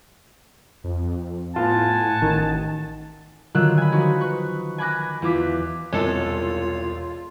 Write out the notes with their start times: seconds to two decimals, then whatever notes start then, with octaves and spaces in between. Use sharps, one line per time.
0.84 F2
1.56 A2 B3 F4 F#5 G#5 A5
2.22 A1 D#3
3.54 D3 D#3 F#3 F4 E6 F#6
3.77 G#5 B5
3.92 F3 D#4 F#4
4.21 B4 C#6
4.78 G#5 B5 D6 F#6 A#6
5.22 E2 F4 D6 B6
5.93 E1 C2 E3 G#3 F4 A4 C#5